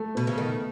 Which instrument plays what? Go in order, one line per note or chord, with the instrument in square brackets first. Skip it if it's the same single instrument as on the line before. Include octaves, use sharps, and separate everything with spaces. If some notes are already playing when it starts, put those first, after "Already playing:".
Already playing: [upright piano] A3
[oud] B2 [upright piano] B3
[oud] C#3
[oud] D#3 [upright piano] A3